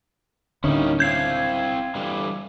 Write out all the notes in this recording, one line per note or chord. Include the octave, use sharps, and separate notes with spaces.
D1 D3 G3 A#3 C#4 D#4 E4
C4 E4 F5 G6 G#6 C7
D3 E3 G3